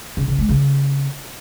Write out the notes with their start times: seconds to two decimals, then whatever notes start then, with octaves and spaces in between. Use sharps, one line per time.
0.17 C#3
0.28 C#3
0.38 G#3
0.49 C#3